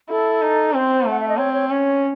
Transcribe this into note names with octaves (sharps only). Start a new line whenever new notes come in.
E4 A4
D#4
C4 C5
A3 F#5
E5
D#5
C4 C#5
C#5
C#4 C#5